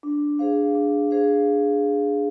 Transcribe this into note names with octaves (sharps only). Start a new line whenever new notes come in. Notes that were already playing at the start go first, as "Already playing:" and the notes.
D4
G#4 C5 F5
D4
G#4 C5 F5